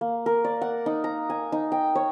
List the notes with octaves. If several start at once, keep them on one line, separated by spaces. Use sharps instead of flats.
A#3
A#4
D5
F#5
D#4
A#5
G#5
D#4
G5
C#5